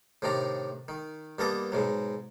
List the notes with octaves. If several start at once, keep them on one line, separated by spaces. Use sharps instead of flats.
A2 C3 D#3 D4 A#5
D#3
G2 A#3 B3 A4 D#5 D6
G#2 B2 F#3